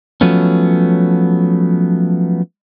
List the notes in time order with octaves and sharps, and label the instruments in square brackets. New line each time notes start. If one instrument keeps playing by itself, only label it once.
[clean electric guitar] F3 F#3 A3 B3 C#4